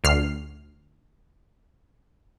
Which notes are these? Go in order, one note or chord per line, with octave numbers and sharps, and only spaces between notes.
D2 F6 C7